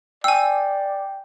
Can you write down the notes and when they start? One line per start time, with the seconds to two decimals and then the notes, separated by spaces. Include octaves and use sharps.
0.24 D5 G5 G#5 E6